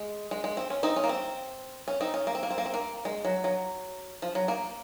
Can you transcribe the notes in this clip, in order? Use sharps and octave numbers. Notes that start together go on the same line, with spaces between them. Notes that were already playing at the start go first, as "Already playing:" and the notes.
Already playing: G#3
G#3
G#3
C4
C#4
C4 D#4
C#4
A#3
C4
C#4
C4 D#4
C#4
A#3
C4
A#3
C4
A#3
C4
A#3
G#3
F#3
F#3
F3
F#3
A#3